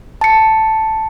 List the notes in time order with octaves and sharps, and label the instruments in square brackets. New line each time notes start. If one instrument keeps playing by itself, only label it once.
[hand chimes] A5 C#7